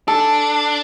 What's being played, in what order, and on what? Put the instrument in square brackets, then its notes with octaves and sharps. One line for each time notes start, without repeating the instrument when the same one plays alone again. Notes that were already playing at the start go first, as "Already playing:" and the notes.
[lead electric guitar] D4 [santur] A4